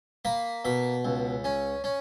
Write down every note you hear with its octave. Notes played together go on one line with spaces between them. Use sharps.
A#3 B5
B2 B5
C#2
C#4
C#4